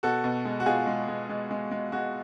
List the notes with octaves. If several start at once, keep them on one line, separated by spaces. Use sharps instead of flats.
B2 F#4 A4
B2
G#3
F#4
B2 F4 G#4
G#3
G#3
G#3
G#3
G#3
G#3 F#4